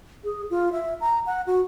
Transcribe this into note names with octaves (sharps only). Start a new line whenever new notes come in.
G#4
F4
E5
A#5
F#5
F#4